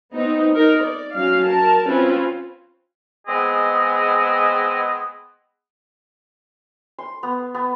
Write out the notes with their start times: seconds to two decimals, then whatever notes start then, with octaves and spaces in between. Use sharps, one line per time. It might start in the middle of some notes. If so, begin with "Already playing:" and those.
0.13 B3 C4 D#4
0.55 D#4 A#4
0.84 D5
1.16 F#3 C#4 F5
1.46 A#4 A5
1.86 C4 C#4 F4 B4
3.27 G#3 B3 C4 G#4 D#5
6.98 C6
7.23 B3
7.54 B3